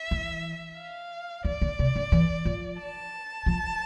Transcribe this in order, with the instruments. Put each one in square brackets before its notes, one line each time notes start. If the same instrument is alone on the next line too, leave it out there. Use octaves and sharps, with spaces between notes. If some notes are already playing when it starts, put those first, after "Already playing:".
Already playing: [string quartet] E5
[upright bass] E3
[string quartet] F5
[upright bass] E3 [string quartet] D5
[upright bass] D3
C3
D3
E3
F3
[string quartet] A5
[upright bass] F3